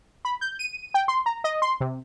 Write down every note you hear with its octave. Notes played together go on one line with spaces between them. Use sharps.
B5
G6
D#7
G5
C6
A#5
D#5
C6
C3